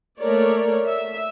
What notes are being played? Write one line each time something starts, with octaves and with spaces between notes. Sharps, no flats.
A3 A#3 A#4 C#5 D5
E5